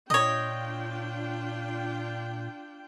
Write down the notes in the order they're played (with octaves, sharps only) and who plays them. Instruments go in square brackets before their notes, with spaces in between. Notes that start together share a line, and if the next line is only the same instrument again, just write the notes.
[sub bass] A#2 [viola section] D4 F4 G5 [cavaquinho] C#5 D#5